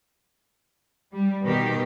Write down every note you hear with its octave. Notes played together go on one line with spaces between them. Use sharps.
G3
B2 D#3 G4